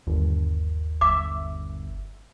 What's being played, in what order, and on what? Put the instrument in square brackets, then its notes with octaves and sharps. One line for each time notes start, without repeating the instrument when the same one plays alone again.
[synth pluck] G1 [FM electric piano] D#2
[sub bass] G1 [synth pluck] E5 [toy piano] D6